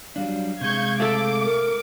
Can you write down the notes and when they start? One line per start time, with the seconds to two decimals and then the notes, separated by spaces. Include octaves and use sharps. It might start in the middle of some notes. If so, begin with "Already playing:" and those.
0.16 F#3 G3 D4 F5
0.61 C3 G#3 C#6 G6 G#6
1.00 A3 A4 D6
1.43 A#4